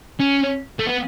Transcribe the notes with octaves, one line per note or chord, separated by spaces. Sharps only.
C#4
A3
B3